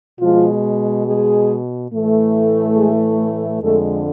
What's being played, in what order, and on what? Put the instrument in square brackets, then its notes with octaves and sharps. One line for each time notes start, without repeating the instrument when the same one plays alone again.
[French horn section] B2 F3 G#3 F4
G#3 G#4
A2 E3 A3
G#3 G#4
F2 D3 G#3 A3 A4